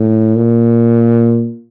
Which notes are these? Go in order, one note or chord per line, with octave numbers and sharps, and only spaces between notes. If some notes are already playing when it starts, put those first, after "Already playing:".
Already playing: A2
A#2